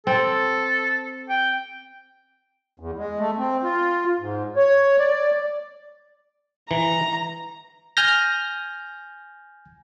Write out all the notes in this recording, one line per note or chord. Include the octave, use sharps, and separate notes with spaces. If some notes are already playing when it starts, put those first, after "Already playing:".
C4 A4
G5
E2
G#3
A3
C4
F4
G#2
C#5
D5
E3 A#5
G#5 F6 G6 A#6